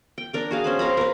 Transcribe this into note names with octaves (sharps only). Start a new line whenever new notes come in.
G5
D4 A#4 G5
F#4 G#4 F5
C#4 C5 B5
C4 F5 A#5 B5
A#4 B4